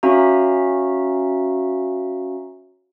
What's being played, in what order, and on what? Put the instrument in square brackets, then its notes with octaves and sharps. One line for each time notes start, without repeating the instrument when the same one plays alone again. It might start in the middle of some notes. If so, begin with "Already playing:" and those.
[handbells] C#4 F#4 E5 F5 A#5